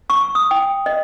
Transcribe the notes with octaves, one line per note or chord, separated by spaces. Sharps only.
C#6
D#6
G5
D#5